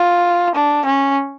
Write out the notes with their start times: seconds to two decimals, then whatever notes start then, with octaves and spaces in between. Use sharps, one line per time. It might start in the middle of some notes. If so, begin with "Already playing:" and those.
Already playing: F4
0.55 D4
0.85 C#4